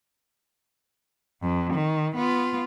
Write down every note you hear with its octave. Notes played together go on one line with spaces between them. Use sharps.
F2
D#3
B3 F4